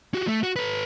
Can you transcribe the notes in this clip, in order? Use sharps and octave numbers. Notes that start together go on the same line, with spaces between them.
F#4 G4
A3
F#4
A4 B4